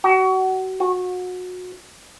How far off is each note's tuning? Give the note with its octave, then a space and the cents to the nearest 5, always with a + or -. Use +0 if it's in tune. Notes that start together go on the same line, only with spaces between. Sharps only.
F#4 +30
F#4 -25